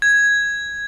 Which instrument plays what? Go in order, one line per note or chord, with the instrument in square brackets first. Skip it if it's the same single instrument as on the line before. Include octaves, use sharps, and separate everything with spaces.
[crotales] G#6